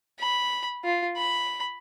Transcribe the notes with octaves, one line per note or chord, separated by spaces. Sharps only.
B5
F4
B5